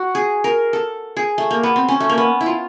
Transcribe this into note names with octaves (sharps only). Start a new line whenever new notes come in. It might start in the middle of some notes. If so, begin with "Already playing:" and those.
Already playing: F#4
G#4
A#4
A4
G#4
A3
A#3
B3
C4
C#4
A3
A#3
B3
E4
F4